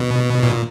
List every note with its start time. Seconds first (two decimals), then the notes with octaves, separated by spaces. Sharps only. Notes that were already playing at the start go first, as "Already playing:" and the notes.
Already playing: B2
0.43 A#2